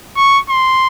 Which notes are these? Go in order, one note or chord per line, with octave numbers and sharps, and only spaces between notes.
C#6
C6